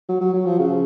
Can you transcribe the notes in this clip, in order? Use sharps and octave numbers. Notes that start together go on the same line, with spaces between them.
F#3
F#3
F#3
F3
C#3